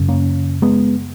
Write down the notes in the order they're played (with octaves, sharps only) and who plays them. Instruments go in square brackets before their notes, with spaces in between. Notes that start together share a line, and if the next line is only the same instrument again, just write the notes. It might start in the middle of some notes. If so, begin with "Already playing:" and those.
Already playing: [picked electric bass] F#2 C#3
A#3 C#4
G#3 B3